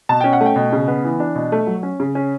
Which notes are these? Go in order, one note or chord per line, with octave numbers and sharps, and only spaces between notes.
B2 A5
C#4 G5
F#5
A3 G5
B2
C#3
B3
E3
D4
B2
A3
F#3
C#4
C#3
C#4